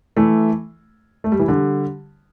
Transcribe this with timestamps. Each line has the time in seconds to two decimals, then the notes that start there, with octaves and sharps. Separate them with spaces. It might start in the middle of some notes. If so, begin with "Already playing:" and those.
0.16 E3 A3
1.24 A3
1.32 G3
1.39 E3
1.48 D3 G3